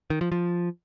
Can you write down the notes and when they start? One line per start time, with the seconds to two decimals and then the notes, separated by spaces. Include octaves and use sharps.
0.10 D#3
0.21 F3
0.32 F3